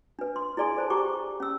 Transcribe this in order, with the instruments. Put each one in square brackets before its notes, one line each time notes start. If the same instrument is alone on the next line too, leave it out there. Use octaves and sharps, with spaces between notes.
[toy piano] D4 B4
C6
E4 G#4 D5 G#5 C6
A4 C5 A5
G4 G5 A#5 C#6 D6
C#4 E6